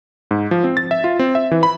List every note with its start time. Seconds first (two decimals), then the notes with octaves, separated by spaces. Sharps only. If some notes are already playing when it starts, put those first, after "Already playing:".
0.31 G#2
0.51 F3
0.64 C4
0.77 A6
0.91 E5
1.04 F4
1.19 C4
1.35 E5
1.51 E3
1.63 B5